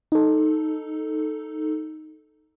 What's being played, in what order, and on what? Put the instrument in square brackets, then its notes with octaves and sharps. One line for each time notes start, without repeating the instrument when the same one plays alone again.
[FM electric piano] D#4 A4